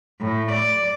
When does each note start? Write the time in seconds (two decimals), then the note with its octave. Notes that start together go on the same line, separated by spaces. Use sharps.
0.21 A2
0.52 D5